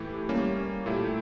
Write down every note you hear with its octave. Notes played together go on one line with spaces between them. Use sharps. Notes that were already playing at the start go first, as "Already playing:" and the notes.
Already playing: A2 E3 A3 E4 G4
G3 A#3 C#4
A#2 A3 E4 G4